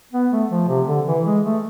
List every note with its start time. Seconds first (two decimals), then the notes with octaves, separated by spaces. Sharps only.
0.13 B3
0.31 A3
0.50 F3
0.68 C3
0.87 D3
1.07 E3
1.26 G#3
1.45 A3